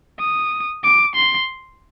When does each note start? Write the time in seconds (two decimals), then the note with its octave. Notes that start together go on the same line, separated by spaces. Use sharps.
0.19 D#6
0.84 D6
1.16 C6